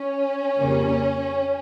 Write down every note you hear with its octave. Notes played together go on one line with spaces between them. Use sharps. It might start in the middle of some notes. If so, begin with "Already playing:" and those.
Already playing: C#4
F2 C#3 G3 A#3